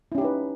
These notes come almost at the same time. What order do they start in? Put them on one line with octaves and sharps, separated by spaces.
E4 C#4 G4 D#4 B4